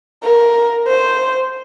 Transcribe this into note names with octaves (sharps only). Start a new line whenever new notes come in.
A#4
C5